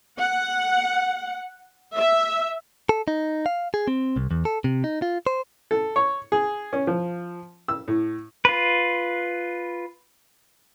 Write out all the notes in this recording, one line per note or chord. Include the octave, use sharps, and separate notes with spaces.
F#5
E5
A4
D#4
F5
G#4
C4
C2
E2
A4
C3
D#4
F4
C5
A4
C#5
G#4
C#4
F3
E6
A2
F4 B4